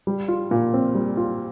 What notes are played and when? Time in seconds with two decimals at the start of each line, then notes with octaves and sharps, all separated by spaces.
0.07 G3
0.28 F4
0.51 A#2
0.73 C4
0.95 G3
1.17 F4